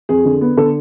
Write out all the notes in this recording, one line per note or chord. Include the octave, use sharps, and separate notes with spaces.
F2 G#4
D3
B3
D3 A4